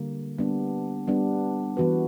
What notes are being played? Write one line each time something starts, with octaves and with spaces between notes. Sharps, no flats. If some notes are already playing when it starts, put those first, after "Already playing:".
Already playing: D3 G3 A#3
G3 B3 D4
G3 B3 D4
E3 B3 F#4 B4